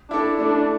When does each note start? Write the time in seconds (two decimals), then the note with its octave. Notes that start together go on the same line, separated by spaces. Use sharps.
0.11 D4 E4 A4
0.39 A3 D4